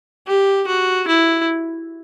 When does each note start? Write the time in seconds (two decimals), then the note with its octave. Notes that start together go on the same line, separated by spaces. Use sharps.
0.27 G4
0.67 F#4
1.07 E4